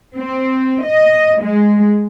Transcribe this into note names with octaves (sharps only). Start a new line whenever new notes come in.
C4
D#5
G#3